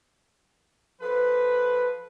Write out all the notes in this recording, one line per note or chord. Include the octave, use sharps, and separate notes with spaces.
F3 A4 B4